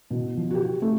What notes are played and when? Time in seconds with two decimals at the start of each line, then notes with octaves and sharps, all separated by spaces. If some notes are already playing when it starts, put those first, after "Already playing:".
0.11 B2
0.37 F3
0.51 F#4 G4
0.82 A3